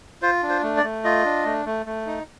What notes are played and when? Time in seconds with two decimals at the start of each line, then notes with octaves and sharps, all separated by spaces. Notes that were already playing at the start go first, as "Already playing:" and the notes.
0.22 F4 C5
0.43 D4
0.49 C5
0.63 A3
0.77 D5
0.83 A3
1.04 F4 D#5
1.25 D4
1.45 A3
1.66 A3
1.86 A3
2.07 D#4